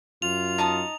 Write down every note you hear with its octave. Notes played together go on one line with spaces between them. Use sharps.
F#2 F4 F7
D#4 A5 D#6